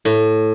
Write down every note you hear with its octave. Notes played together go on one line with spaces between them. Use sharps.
A2